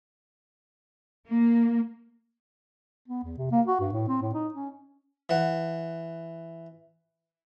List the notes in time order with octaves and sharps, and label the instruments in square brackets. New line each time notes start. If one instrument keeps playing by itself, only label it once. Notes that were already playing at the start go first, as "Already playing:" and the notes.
[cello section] A#3
[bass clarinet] B3
E2
C3
A#3
F#4
G2
A2
C4
A2
D#4
C#4
[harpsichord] E3 F#5